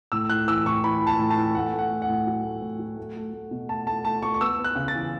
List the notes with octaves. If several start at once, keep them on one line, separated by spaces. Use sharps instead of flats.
A2 E6
A2 F#6
E3 E6
A2 C#6
E3 B5
E3
A5
A2
A5
E3
A3 F#5
A3
F#5
A3
F#5
A2
F#3
A3
A2
F#3
A3
A3
A3
B2
A3 A5
A3 A5
A3 A5
A3 C#6
C#6
B3 E6
B3
F#6
C#3
A6
E3